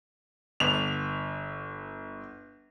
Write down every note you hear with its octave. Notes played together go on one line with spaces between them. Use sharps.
G1 F7